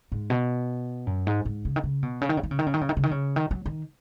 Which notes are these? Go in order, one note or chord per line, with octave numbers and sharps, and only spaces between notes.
G#2
B2
F#2
G#2
G#2
C#3
D#3
C#3
B2
C#3
D#3
C#3
D#3
C#3
D#3
C#3
D#3
C#3
D#3
C#3
D#3
C#3
D#3
F#3
D#3